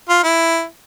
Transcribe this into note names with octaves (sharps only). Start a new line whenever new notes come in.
F4
E4